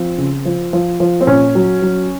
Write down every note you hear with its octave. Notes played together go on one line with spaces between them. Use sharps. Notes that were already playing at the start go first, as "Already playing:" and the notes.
Already playing: F3 C4
C#3
F3
F3
F3
C4
A#2 C#4
F#3
F#3